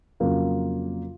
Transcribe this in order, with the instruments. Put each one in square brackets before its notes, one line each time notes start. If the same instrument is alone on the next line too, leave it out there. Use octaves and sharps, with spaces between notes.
[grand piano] F2 C#3 F#3 A#3 F4